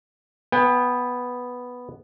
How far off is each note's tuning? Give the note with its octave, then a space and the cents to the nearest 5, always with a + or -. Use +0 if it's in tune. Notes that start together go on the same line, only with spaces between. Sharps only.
B3 +0 G5 +35